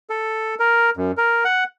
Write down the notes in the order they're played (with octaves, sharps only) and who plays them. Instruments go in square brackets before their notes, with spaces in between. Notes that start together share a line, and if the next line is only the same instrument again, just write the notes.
[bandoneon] A4
A#4
F#2
A#4
F#5